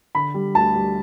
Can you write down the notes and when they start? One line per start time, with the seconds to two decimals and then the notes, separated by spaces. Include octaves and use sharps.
0.15 D3 B5
0.34 G3
0.55 D2 A5
0.75 G3